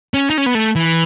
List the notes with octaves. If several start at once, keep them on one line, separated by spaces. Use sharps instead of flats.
C#4
D#4
C#4
B3
A3
E3